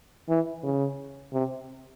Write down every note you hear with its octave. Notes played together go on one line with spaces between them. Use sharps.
E3
C#3
C3